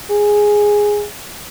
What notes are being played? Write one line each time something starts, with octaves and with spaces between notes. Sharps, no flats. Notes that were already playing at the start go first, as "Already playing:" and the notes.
G#4